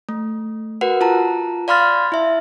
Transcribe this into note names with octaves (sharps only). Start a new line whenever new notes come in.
A3
F#4 A#4 B4 F#5
F4 A5 A#5
D5 F5 B5 C6 F6 A6
E4 E5